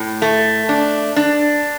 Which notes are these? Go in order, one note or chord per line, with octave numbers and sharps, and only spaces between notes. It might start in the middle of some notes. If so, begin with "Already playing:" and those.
Already playing: A2
A3
D4
D4